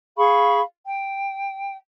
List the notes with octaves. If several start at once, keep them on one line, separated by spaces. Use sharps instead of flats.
G#4 F5 B5 C#6
G5